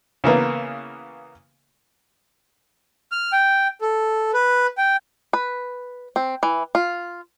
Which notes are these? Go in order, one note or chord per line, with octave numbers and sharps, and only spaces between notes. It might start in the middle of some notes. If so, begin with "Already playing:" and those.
C#3 E3 A#3 B3
F6
G5
A4
B4
G5
B4
C4
E3
F4